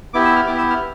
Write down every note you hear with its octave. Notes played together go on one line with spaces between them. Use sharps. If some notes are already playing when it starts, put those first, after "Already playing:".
B3 E4 G4 D6
E6
F6
B3 E4 G4 D6
E6
F6